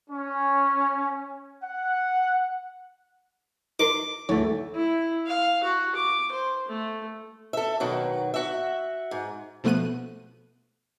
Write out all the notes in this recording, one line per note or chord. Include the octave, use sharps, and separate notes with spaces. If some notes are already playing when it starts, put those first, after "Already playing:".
C#4
F#5
D#4 A#4 C6 D6
D2 G#2 E3 A3 C#5
E4
F5
F#4
D6
C5
A3
A4 E5
B2 D#3 F#3
F#4 E5
G#2
B2 F3 A3 B3 F#6 D#7